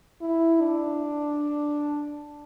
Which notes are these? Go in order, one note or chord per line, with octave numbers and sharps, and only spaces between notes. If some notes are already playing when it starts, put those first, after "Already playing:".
E4
D4